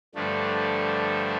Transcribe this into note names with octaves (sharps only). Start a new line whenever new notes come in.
G2 D3 F3 A3 D4